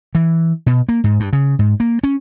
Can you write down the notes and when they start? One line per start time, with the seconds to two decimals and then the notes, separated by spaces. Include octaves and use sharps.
0.15 E3
0.66 B2
0.89 A#3
1.04 G#2
1.20 G2
1.33 C#3
1.59 G#2
1.80 A#3
2.04 C#4